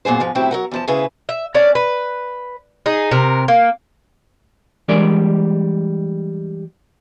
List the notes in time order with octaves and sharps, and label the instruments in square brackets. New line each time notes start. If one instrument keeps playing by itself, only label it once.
[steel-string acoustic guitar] F#2 A#2 B3 G#4 C5
G#2 F3 G#3
A2 D#3 F#3 C4 E4 G4
F#3 A#4 F#5
E2 F3 A5
D2 C#3 E4 G#4 B4
[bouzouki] E5
C#4 D4 D5
B4
D#4 G#4
C3 A#4
A#3
[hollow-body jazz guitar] E3 G3 G#3 D4 A#4 D5